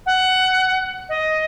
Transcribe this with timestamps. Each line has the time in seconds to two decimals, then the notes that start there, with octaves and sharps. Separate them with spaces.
0.06 F#5
1.09 D#5